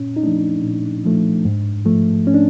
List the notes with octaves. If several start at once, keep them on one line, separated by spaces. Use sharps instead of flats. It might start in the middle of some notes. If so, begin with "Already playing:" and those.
Already playing: A#2 C#4
D#4
F3 A3 D4
A#2
F3 A3
G#2
F3 A3
C#4
D4